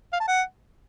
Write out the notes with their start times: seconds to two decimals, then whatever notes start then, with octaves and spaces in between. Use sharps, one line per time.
0.13 F5
0.20 A5
0.28 F#5